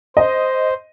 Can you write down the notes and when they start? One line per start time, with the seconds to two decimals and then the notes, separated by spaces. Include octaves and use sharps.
0.17 C5 D#5